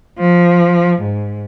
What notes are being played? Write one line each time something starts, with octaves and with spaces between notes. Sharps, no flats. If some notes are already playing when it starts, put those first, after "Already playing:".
F3
G#2